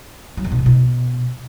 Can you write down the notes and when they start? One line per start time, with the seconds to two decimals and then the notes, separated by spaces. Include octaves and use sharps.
0.37 F#3
0.44 E2
0.52 B2
0.59 E2
0.66 B2